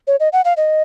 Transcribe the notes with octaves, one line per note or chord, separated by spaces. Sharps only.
C#5
D#5
F#5
F5
D#5